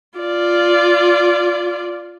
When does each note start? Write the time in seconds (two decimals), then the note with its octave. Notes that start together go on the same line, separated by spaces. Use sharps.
0.18 F4 D5